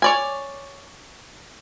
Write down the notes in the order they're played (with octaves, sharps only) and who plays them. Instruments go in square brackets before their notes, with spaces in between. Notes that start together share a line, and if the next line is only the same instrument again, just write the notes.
[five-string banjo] C#5 D5 G#5